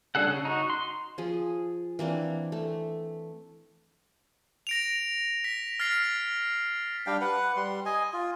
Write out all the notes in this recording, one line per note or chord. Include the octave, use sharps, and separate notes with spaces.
G3 D4 G#4 A4 F#5
C#3
D#4 F#4
C6
F3 G#4
E3 A#3 C4 D4
A3
A#6 D7 F7
B6
F6 A6 C7
G3 D4 F5 G5
B4 F#5
G3 C6
D#5 G#5
F4